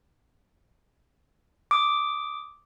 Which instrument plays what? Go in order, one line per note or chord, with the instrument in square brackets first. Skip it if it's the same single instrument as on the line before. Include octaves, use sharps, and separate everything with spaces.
[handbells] D6 D#6